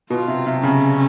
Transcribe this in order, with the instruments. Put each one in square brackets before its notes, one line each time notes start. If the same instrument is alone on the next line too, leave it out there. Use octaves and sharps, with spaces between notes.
[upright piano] B2 [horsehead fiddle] F4
[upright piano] C3
C3
[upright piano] C#3 [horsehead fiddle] C#4